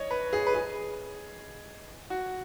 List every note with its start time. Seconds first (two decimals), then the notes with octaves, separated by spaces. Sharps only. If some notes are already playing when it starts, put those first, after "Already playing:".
Already playing: C#5 D#5
0.10 B4
0.33 G#4
0.47 B4
0.55 G#4
2.10 F#4